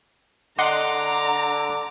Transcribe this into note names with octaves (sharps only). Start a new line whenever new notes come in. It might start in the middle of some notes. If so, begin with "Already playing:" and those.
D3 D#5 F#5 A#5 C6 D6